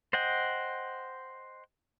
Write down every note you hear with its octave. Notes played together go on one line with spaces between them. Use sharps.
C5 D#5 F#5 G5